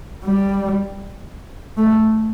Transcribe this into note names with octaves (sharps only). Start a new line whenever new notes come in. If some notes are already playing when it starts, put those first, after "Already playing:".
G3
A3